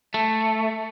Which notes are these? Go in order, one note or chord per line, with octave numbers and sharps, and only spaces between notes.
A3